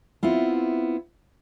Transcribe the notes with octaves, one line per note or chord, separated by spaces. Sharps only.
B3 C4 E4 F4